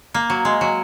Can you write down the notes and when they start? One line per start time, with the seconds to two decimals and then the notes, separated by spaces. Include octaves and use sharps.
0.14 A#3
0.30 F#3
0.45 G#3
0.61 F#3